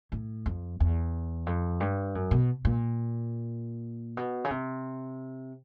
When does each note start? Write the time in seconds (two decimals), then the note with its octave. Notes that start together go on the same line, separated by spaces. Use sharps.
0.12 A2
0.46 F2
0.80 E2
1.47 F2
1.80 G2
2.15 F#2
2.31 B2
2.65 A#2
4.17 B2
4.45 C#3
4.51 C3